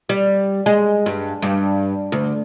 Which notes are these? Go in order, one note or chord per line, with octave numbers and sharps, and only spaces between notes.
G3
G#3
G2
G2
D2